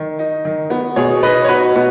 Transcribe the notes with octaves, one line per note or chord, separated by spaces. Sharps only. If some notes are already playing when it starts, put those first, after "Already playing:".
Already playing: D#3
D#4
D#3
B3
B2 G#4 C#5
D#4 B4 D#5
C#5
D#4 F#4 B4
B2 F#4